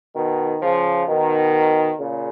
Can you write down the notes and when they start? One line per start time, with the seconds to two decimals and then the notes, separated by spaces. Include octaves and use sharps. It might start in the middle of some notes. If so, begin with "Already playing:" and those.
0.16 B2 D#3
0.62 C#3 F3
1.08 B2 D#3
2.00 A#2 C#3